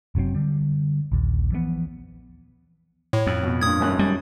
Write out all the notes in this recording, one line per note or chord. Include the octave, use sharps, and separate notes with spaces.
F#1 C3 F#3 C4
D3 G3
A#1 D#2
E3 F3 G#3 B3
A2 C#5
F2
B2
G2 A#2 D#6 G#6
G#1 F#2 F#6
G3